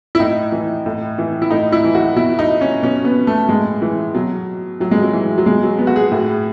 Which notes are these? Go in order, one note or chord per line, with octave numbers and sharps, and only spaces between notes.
E4
A2 D#4
E3
A2
E3
E4
A2 D#4
E4
E3
F#4
B2 E4
D#4
C#4
B2 C#4
B3
A3
A2 G#3
E3
B2 F#3
A2 F#3
G#3
F#3
E3
F#3
B2 G#3
F#3
B3
F#4
G#4
A2